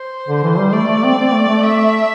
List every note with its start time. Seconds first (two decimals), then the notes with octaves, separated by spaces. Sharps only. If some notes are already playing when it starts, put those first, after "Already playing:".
Already playing: C5
0.28 D3
0.44 E3
0.58 G3
0.73 A3 D5
0.88 A3
1.04 C4
1.18 C4
1.33 A3
1.48 A3
1.63 E5